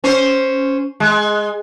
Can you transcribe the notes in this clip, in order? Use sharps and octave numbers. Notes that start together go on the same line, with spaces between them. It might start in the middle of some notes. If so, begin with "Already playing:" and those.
C#4 C5
G#3